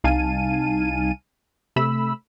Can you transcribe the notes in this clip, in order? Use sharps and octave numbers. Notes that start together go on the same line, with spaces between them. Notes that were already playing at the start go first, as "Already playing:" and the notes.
C2 D#4 F5 G#5 A5 D#7
C3 A3 B5 E6